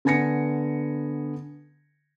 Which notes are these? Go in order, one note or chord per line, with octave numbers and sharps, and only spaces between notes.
D3 B3 G#5 A#6 C#7